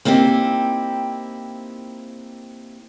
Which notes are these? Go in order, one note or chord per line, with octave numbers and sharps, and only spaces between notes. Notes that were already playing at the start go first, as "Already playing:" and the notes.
A#3 C4 D#4 E4 G4